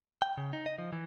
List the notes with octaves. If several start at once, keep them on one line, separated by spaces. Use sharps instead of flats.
G5
C#3
D#4
D#5
F3
E3